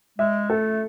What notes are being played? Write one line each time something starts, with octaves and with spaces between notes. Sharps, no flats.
G#3 E5
A3 A4